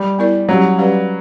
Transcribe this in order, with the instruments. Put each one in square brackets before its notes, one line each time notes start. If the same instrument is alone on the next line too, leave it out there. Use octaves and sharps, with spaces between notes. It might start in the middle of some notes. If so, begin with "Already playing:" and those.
Already playing: [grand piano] G3
[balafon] B3 E4 A#4 D5
[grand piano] F#3 [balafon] G3 C#4 G4
[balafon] G3 C#4 G4 B4 D5